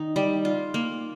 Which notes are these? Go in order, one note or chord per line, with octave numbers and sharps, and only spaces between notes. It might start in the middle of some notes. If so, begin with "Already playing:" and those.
Already playing: D#3 D#4
G3
F4
A#3